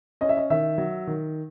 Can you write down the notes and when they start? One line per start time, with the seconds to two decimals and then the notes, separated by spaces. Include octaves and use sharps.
0.21 C#4 D#5
0.29 E5
0.37 D#5
0.50 D#3 E5
0.78 F#3
1.07 D#3